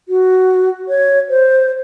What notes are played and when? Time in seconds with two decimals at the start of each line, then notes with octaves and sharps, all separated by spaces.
0.08 F#4
0.88 C#5
1.30 C5